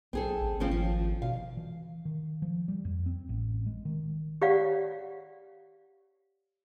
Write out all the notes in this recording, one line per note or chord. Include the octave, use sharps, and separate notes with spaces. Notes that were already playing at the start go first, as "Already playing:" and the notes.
B1 C4 G#4 A4
A1
G#1 F3 C4 C#4
F3
B2 F5
E3
D#3
F3
G3
F2
C4
A1
G#3
D#3
G4 C#5 D5 F5 F#5